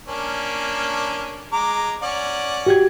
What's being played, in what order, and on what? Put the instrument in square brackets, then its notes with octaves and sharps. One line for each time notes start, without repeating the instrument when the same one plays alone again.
[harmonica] A#3 C#4 D4
G#3 A#5 D6
C#4 D5 F#5
[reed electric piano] F#4 G4 G#6